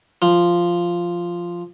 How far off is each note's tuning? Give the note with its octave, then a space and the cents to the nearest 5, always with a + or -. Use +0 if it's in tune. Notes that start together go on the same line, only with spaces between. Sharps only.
F3 -5